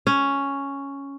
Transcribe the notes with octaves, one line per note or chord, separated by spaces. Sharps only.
C#4